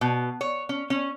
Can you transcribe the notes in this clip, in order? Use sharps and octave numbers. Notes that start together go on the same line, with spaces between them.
B2
C#5
C#4
C#4